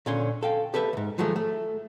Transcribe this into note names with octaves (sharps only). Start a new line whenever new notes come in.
A#2 D3 C#4 C#5 C6
A4 F5 G5
G4 A4 B4 E5
C#2 G#2
D#3 F3 F#3 G#3 A3
A3